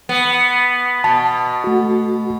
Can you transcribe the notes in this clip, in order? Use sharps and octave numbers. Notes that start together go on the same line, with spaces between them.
B3
B2 A5
A3 F#4